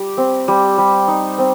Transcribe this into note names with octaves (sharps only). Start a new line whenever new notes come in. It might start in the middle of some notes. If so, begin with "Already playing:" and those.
Already playing: G3 G4
C4
G3
G3
D#4
C4